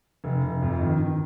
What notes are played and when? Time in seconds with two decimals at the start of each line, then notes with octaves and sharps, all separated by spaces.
0.24 F1
0.43 F1
0.62 F2
0.81 D#3
1.00 D#3